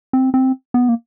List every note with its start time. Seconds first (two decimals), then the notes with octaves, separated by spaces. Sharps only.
0.13 C4
0.34 C4
0.74 B3
0.89 A#3